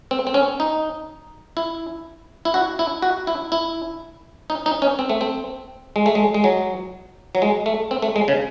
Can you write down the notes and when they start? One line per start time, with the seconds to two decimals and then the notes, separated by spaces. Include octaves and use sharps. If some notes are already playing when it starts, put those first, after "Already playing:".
0.11 C4
0.27 C4
0.34 C#4
0.60 D#4
1.57 E4
2.45 E4
2.54 F#4
2.79 E4
3.02 F#4
3.27 E4
3.52 E4
4.50 D#4
4.66 D#4
4.82 C#4
4.99 C4
5.09 A3
5.21 C4
5.96 G#3
6.06 A3
6.15 G#3
6.34 G#3
6.44 F#3
7.35 F#3
7.42 G#3
7.66 A3
7.91 C4
8.02 A3
8.16 G#3
8.28 C#3